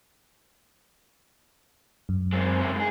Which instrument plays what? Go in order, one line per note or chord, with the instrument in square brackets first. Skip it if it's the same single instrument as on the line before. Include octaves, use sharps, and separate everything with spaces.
[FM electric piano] F#2
[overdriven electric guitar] G#3 C4
C#3 C5
G#2 G#4